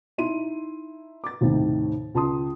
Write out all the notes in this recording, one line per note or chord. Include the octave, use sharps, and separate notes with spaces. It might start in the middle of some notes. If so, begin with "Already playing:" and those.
D#4 E4 C6 D#7
D6 A6
D#2 A2 C3 D#3
C#2 A5 C6 D#6